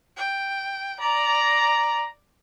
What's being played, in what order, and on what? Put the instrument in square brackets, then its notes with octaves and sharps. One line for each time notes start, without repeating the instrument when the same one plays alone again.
[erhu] G5
[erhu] D5 [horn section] A#5